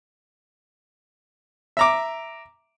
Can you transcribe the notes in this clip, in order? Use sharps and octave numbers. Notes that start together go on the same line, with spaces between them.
E5 A#5 D6